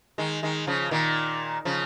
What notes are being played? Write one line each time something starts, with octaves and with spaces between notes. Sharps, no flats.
D#3 G#3
D#3 G#3
C#3 F3
A#2 D#3
C#3 F3